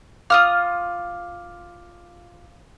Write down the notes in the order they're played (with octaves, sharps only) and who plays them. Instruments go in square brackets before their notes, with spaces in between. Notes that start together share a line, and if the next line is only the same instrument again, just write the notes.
[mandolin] F4 D#6 F6 [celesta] F5 D6